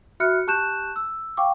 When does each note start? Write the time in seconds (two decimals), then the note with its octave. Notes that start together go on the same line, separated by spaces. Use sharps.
0.20 F#4 E5 B5 F6 F#6 C#7
0.47 G4 A5 C#6 F#6 G6 E7
0.96 E6
1.37 F5 G5 C#6 D6